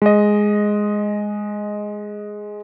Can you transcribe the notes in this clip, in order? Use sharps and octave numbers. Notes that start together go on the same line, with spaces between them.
G#3 D#5